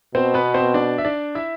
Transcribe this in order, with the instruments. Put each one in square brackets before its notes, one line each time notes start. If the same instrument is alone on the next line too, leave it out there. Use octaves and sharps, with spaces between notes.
[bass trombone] B2 [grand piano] C4 C5
[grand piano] B3 B4
C4 C5
D4 D5
E5
D4 D5
E4 E5